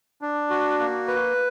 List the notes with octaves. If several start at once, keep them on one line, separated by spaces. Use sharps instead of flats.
D4
F#4
A#3
B4